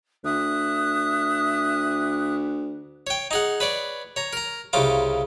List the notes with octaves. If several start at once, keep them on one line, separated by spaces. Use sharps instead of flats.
D2 E5 D#6 F#6
C#5 G5
D#4 G#4 F#5
B4 C#5 D5
C#5 A#5
A#4 A#5
C2 C#3 F4 D6